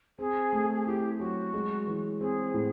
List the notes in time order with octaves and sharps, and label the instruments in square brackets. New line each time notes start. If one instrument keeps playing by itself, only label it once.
[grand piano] C4 [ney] G#4
[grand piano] A3
[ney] G#4
[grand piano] E4 [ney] G4
[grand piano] F#3 [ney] F#4
[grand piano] G#3
E3
[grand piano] C4 [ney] G#4
[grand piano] A2